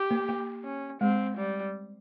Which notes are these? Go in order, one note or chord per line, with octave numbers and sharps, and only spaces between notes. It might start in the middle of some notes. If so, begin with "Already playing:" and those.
Already playing: G4
A#3
A#3
C#4
G#3 C4
G3